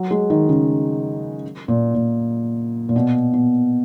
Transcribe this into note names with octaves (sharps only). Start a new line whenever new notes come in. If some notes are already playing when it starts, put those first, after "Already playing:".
Already playing: F#3
G#3
D#3
C#3
A#2
A#2
A#2
B2
B2